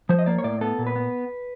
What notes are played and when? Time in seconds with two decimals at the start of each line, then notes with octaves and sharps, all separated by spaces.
0.09 F3 C5
0.19 D#5
0.26 A#3 D5
0.38 C#5
0.44 A2 D5
0.61 B3 A4
0.78 A#2
0.87 B4
0.96 B3